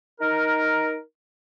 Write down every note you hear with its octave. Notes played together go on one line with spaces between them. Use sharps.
D#4 A#4